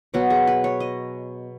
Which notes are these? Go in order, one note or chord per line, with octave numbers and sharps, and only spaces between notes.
B2 F#3 B3 F#4
G#4
B4
C#5
D#5